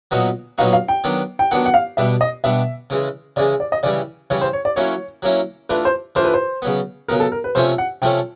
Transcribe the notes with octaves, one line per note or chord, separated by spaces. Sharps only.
A#2 F#3 B3 D#4 F#4 F#5
A#2 F#3 B3 D#4 F#4 F5
F5
G5
D#3 F#3 B3 D4
G5
D#3 F#3 B3 D4 F#5
F#5
F5
B2 G3 B3 D4 E5
D#5
B2 G3 B3 D4 E5
C#3 E3 G#3
C#3 E3 G#3 D5
D5
D#5
C#3 E3 G3 D5
C#3 E3 G3 C#5
C5
C#5
D5
F#3 A#3 C#4 E4 C#5
F#3 A#3 C#4 E4
E3 A3 D4 F4 B4
C5
E3 A3 D4 F4 C5
B4
C5
C#3 F#3 B3
C#3 F#3 B3 A#4
A4
A#4
B4
C3 F3 A3 C#4 C5
F#5
C3 F3 A3 C#4 G5